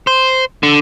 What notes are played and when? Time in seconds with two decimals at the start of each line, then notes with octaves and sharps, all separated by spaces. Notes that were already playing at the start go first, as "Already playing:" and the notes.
0.07 C5
0.63 D3